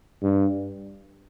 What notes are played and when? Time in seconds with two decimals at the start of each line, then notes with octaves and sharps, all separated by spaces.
0.22 G2